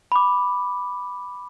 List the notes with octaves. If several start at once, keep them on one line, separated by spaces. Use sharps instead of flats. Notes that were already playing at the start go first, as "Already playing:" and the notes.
B5 D6